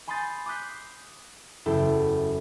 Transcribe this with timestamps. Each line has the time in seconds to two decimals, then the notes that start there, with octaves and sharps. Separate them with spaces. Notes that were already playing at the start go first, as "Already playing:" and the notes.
0.07 G#5 B5 C6 D#6 G6 A6
0.46 D6 D#6 F#6 G6 B6 C7
1.66 F#1 E2 E4 A4 G5